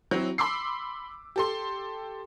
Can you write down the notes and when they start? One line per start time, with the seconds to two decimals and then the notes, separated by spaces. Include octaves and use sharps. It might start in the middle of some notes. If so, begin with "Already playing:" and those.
0.11 F#3 C4 E4
0.38 B5 C6 D6 E6 C7
1.36 G4 A4 C6